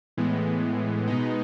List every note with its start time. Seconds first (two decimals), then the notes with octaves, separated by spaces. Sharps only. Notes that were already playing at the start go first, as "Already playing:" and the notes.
0.17 A2 E3 G#3 B3
1.08 B2 G#3 B3 D#4